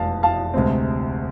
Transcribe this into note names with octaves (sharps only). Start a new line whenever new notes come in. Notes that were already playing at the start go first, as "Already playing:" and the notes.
Already playing: F1 E2 C3 G#3 F5 A5
F5 A5
D2 C3 G#3 C4